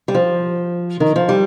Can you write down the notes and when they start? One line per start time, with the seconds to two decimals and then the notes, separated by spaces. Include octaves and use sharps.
0.08 G3
0.14 F3
1.00 D#3
1.16 F3
1.29 G3